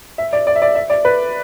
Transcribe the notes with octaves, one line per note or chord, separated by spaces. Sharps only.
E5
D5
D5
E5
D5
E5
D5
B4